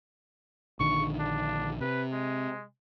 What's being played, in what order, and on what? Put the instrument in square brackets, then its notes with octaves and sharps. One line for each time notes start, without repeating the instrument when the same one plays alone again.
[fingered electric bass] A#1 D3 D#3 [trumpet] C#6
[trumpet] D4
[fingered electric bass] C3 [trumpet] B4
[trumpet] G#3